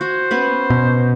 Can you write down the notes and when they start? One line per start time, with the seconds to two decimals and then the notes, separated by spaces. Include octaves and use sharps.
0.01 F#4 C5
0.31 B3 C#4 B4
0.70 B2